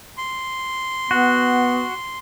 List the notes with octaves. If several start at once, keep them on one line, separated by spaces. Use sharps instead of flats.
C6
B3 F#4